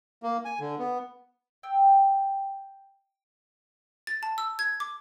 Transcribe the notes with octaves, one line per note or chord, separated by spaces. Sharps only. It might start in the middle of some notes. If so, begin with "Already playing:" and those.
A#3
G#5
D3
B3
G5 E6
A6
A5
E6
G#6
D6